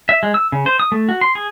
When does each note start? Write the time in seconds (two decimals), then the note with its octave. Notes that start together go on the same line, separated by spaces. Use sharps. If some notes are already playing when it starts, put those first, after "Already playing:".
0.09 E5
0.23 G#3
0.34 E6
0.52 C#3
0.66 C5
0.80 D#6
0.92 A3
1.09 F#4
1.21 C6
1.35 G#4